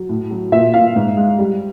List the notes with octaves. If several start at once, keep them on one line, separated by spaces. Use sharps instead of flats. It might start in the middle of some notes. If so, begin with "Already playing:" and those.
Already playing: F#3
A2
F#3
A#2 E5
A#2 F5
G#2
G#3
G3